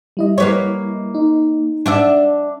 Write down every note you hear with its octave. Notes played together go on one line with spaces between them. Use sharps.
G3 E4 D#5
A#3 B4 C#5
D#4
D4 D5 E5